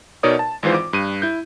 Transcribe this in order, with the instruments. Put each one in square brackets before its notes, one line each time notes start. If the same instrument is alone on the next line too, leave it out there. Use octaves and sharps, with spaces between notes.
[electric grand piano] B2 D#4 A#4 C#5 D5 D#6
A5
G#1 G#2 E3 F4 C5
D6
G2 D#7
E4 G6